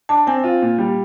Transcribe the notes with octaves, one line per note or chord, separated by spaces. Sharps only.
D4 A5
C4 G#5
F4
A#2
G3